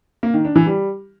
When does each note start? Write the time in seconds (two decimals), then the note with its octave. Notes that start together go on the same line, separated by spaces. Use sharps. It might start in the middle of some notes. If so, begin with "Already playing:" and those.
0.23 A#3
0.34 D#3
0.45 D4
0.56 E3
0.66 G3